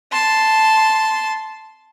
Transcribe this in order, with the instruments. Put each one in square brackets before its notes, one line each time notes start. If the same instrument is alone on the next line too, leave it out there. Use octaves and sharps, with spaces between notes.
[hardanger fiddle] A5 C6